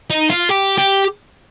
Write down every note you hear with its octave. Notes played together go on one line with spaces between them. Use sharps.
D#4
F4
G4
G4